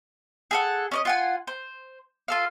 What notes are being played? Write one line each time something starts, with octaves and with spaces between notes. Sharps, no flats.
G#4 A4 F#5
C#4 D5 D#5
F4 F#5 G#5
C5
F4 A4 F5